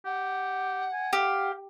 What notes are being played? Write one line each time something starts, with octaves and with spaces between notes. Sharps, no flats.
G4 F#5
G#5
G4 F5